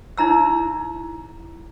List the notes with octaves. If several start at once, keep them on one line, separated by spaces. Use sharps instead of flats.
D#4 E4 A#5 E6